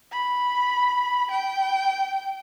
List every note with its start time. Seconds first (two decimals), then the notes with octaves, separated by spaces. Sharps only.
0.12 B5
1.31 G5